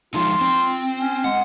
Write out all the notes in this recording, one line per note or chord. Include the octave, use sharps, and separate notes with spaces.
F3 G#3 D#4 F4
C4
C#4
G#3 F#5